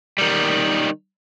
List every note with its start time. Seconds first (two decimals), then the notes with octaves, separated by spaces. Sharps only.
0.18 D#3 G3